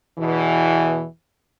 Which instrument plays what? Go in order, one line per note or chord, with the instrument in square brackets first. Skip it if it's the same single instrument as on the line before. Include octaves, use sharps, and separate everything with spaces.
[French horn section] E2 B2 E3